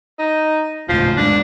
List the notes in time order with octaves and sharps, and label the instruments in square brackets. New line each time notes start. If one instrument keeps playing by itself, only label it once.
[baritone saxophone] D#4
[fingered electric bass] D#1 C#2 A2 [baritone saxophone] F3
[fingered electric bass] F1 C3 G#3 [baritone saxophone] D4